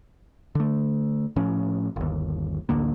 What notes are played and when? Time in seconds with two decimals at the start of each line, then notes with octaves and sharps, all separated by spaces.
0.55 D3 A3
1.36 A2 F3 C#4
1.96 G1 D#2
2.69 A1 D2 D3 A#3